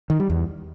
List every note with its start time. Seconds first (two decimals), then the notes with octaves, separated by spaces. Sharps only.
0.10 D#3
0.20 G3
0.30 E2